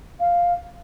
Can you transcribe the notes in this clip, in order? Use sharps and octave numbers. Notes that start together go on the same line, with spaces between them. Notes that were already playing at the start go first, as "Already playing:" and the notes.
F5